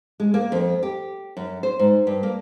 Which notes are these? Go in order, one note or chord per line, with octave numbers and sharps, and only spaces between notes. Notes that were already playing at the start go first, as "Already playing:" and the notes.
G#3
A#3
F2
G4
F#2
C5
G#2
G2
A#3